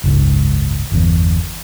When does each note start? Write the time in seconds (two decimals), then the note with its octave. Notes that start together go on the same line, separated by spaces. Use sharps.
0.04 F#1 C#2 G#2
0.92 G1 E2